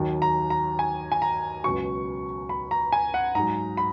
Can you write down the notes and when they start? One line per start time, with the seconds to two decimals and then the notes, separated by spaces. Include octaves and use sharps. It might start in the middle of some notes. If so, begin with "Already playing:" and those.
Already playing: D#2 D#3 F#3
0.22 A#5
0.50 A#5
0.79 G#5
1.12 G#5
1.22 A#5
1.64 C#2 B2 F#3 C#6
2.49 B5
2.71 A#5
2.92 G#5
3.14 F#5
3.35 G#2 F#3 A#5
3.77 B5